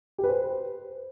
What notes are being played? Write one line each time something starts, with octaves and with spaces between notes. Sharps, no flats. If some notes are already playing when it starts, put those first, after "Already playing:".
G4
B4
C5